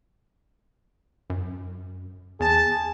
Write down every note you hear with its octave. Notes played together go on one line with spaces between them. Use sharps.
F#2
E2 G#4 A5